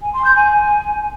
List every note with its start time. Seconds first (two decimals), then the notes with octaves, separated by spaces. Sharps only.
0.02 G#5
0.13 C6
0.24 G6
0.36 G#5